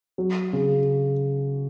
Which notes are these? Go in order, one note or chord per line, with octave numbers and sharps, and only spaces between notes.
F#3
C#3